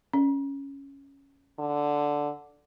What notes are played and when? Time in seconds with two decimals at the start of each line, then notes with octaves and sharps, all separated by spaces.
0.14 C#4
1.59 D3